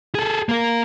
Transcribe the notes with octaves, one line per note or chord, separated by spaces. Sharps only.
G#4 A4
A#3 A#4